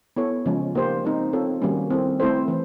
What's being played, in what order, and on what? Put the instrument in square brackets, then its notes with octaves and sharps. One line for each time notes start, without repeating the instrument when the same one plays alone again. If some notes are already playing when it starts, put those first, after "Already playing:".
[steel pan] B3 E4 A4 C#5
C#3 F3 G#3 C#4
A#3 D#4 G4 C5
G#3 C4 D#4
C4 F4 A4 C#5
D#3 G3 A#3 C#4 F#4
C4 E4 A4
A3 C4 E4 A4 C5
E3 A3